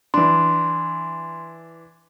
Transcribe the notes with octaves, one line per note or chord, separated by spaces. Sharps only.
E3 D4 C6